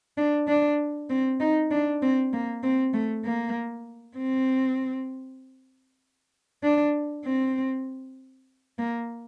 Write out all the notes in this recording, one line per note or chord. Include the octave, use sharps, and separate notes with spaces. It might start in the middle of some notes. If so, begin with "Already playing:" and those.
D4
D4
C4
D#4
D4
C4
A#3
C4
A3
A#3
C4
D4
C4
A#3